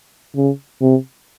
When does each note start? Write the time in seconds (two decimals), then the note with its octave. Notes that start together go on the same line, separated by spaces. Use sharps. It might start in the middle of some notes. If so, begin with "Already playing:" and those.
0.35 C#3
0.81 C3